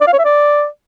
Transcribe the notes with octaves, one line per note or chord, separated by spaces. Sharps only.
D5
F5
C#5
E5
D5